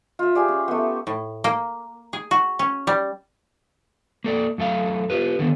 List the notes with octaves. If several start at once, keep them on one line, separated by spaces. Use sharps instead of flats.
F4 E5
G4 G#4 D5
C#4
A3 B3
A2
A#3
G#4
F#4
C#4
G3
A#3 A4 D5
F#2 A3 A4 F5
F4 G4 B4
D3 D#3 B3